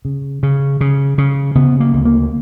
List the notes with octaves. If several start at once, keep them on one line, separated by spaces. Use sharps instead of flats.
C#3
C#3
C#3
C#3
C#3 B3
A#3
D2
A#3